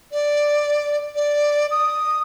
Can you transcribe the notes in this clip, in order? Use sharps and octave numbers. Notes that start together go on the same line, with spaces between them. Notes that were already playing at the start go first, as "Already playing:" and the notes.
D5
D5
D#6